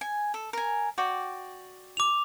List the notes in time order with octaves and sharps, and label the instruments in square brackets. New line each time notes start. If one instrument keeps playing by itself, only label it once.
[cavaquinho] G#5
A4
A#4 G#5
F#4 D5 G5
[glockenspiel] D6 F7